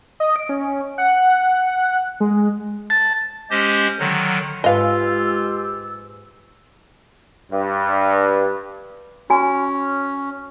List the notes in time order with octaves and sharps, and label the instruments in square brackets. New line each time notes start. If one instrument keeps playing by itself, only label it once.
[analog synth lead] D#5
D7
C#4
F#5
G#3
[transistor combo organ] A5
[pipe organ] G#3 C#4 G4 C5 D#5
D3 D#3 F#3
[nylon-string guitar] G#2 B4 [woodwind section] G#3 G4 E6 [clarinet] F4 [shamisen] D#5 F5
[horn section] G2
[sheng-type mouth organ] C#4 [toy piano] F#4 G#5